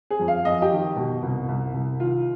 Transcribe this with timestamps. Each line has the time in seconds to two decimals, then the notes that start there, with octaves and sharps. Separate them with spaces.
0.10 G#4
0.19 F2
0.28 F5
0.45 F2 D#5
0.62 G4
0.71 D#3
0.96 B2
1.22 C2
1.48 C2
1.74 C2
2.00 D#3 F4